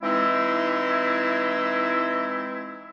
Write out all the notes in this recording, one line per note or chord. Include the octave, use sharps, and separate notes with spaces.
E3 G#3 C4 D#4 E4